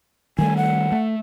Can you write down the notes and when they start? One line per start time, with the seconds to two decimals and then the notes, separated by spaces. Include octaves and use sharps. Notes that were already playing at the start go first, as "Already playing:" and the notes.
0.38 D#3 G3 A3 G#5
0.57 F#5
0.92 A3